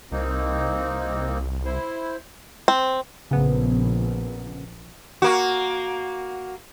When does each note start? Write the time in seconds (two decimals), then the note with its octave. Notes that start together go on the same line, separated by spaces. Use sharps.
0.12 C2 A#3 C4 D#4
1.65 E4 C5
2.68 C4
3.31 A#1 C#3 B3
5.22 A#3 F#4